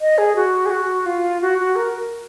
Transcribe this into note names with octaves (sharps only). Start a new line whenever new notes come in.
D#5
G#4
F#4
G#4
F#4
F4
F#4
F#4
A#4